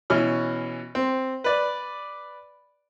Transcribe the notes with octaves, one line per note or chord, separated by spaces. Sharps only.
B2 E3 C#4 F6
C4
B4 D5